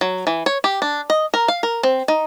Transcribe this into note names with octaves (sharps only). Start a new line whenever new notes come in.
F#3
E3
C#5
G4
D4
D#5
A#4
F5
A#4
C4
D#4